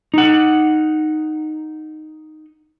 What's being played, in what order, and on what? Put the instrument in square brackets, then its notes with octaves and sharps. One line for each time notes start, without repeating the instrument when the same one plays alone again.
[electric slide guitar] D#4 F#5